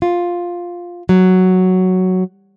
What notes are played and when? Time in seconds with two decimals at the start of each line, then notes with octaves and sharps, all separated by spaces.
0.02 F4
1.09 F#3